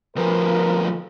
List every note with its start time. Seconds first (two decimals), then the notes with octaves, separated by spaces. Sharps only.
0.16 D2 F3 A#4 B4